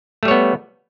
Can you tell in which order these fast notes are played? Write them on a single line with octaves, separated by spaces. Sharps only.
A3 G3 C#5 B3